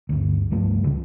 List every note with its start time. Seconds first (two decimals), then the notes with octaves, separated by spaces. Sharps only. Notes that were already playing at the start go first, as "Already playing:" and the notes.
0.09 G1 D2
0.50 C#2 G2 F3 A3
0.84 C#2 C#3